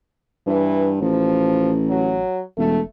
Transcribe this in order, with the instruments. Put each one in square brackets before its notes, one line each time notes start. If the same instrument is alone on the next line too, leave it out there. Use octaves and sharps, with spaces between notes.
[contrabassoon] G2 [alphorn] E3
[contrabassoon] A1 [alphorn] F3
[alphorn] F#3
[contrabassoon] E1 [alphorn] A3